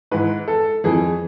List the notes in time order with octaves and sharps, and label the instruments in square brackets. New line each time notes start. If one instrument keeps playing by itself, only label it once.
[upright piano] G#2 E3 B4
A4
F2 E3 G#4